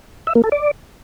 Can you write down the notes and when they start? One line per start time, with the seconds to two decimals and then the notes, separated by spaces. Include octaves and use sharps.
0.27 E5
0.35 A#3
0.44 A4
0.52 D5